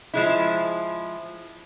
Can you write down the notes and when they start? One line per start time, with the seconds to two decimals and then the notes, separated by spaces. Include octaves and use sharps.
0.14 F3 G#3 E4